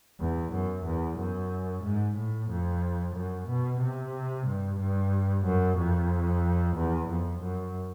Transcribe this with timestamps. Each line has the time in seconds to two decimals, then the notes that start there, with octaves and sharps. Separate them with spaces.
0.20 E2
0.53 F#2
0.85 E2
1.19 F#2
1.84 G#2
2.17 A2
2.50 F2
3.16 F#2
3.48 B2
3.81 C3
4.47 G2
4.79 G2
5.45 F#2
5.77 F2
6.76 E2
7.09 F2
7.42 F#2